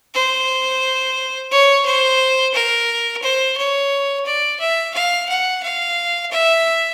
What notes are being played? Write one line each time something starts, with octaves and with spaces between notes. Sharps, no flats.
C5
C#5
C5
A#4
C5
C#5
D5
E5
F5
F#5
F5
E5